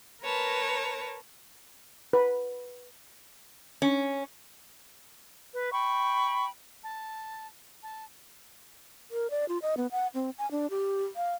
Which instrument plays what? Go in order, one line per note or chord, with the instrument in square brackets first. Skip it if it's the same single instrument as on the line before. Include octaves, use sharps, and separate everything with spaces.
[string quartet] A#4 B4 C#5 A5 A#5
[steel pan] B4
[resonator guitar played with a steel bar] C#4
[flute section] B4
G5 B5 C#6
A5
A5
[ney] A#4
D5
F4
D#5
B3
F#5
C4
G#5
D4
G4
F5